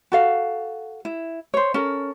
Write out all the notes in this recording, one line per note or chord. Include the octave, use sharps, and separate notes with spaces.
F#4 A4 F5
E4
C5 C#5
C#4 A4 A#4